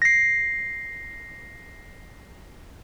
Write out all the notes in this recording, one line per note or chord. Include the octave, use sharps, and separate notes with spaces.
A#6 C7